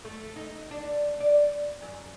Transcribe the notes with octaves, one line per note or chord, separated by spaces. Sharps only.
A3
D#4
D4
D5
F#2